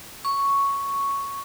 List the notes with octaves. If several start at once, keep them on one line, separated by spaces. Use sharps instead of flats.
C#6